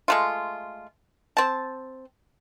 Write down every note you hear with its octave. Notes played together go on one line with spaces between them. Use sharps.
G#3 A3 F4
C4 A5